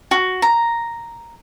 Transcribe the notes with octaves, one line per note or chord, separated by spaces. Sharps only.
F#4
A#5